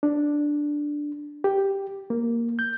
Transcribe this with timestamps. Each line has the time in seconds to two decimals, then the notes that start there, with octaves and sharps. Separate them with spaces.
0.03 D4
1.44 G4
2.10 A#3
2.59 G6